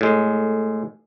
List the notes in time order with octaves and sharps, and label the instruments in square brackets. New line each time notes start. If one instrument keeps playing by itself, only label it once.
[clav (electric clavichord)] A2 G#3